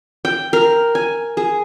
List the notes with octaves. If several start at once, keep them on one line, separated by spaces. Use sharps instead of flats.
G5
A#4
G#5
G#4